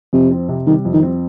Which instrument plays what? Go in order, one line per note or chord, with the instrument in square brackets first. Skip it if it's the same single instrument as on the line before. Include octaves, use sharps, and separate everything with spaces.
[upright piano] F2 [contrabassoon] C3
[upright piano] C4
C3
[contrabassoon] D#3 [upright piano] G3
[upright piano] F2
[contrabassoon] D#3
[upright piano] C4